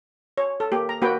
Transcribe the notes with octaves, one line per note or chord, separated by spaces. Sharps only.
C#5
A4
A#3 G4
A#5
A#3 F#4 B4 G5